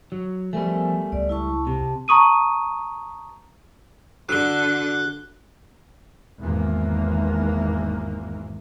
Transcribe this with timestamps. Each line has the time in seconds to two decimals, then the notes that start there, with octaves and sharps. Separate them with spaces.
0.12 F#3
0.53 F3 G3 A3 B3 A#4 G#5
1.12 C#2 D5
1.29 E4 A5 C#6
1.67 C3 A5
2.08 A5 A#5 C#6 D#6 D#7
4.29 D3 D4 F#4 A4 F#6 G7
6.41 G#1 E2 A#3